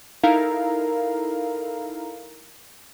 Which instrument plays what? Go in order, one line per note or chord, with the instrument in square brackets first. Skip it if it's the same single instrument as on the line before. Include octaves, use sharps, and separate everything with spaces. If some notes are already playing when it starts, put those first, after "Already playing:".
[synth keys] D#4 E4 A4 A#4 F5 A#5